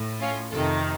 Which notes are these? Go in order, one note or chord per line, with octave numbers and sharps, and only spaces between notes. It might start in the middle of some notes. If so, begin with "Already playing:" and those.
Already playing: A2
C#4 F4
F2 C3 D#3 F4 A4